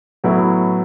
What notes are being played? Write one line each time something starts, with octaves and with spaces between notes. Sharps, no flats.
A2 F#3 B3 E4